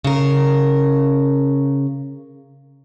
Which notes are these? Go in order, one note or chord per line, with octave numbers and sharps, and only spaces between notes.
C#3 A#4